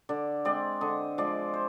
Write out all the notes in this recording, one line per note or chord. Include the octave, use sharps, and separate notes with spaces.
D3 D5
G#3 C4 D5
D3 D#5
F3 G#3 D5
C5